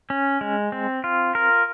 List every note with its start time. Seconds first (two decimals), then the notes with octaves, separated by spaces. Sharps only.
0.10 C#4
0.41 G#3
0.72 C4
1.04 F4
1.35 A#4